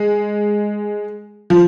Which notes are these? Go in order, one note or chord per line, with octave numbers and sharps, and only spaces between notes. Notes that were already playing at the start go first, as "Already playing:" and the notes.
Already playing: G#3
F3